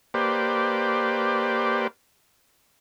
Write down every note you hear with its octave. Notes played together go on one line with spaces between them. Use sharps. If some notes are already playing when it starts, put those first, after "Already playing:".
A#3 G4 B4 C5 D5